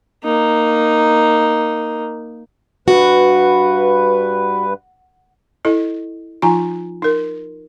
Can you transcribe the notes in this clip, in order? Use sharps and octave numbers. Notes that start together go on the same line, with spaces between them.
A#3 D#4
G2 F#4 B4
E4 A4 D#5
F3 D#4 F4 G#5 A#5
D#4 A#4